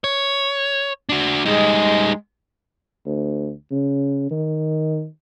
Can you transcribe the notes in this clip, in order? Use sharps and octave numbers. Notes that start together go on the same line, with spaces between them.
C#5
D4 F#4
G3 G#3 D#4
D2
C#3
D#3